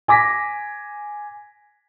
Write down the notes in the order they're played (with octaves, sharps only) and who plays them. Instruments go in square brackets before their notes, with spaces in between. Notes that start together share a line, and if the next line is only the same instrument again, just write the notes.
[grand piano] G#5 D6 A#6 B6